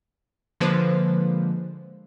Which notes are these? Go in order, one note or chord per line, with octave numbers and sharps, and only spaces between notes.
D3 F3 G#3 A#3 B4 C5